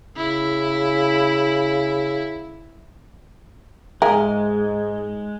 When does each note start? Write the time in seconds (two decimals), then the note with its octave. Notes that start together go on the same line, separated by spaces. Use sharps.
0.17 C#3 E4
4.02 G#2 G#3 G#4 A#4 E5 F5 G#5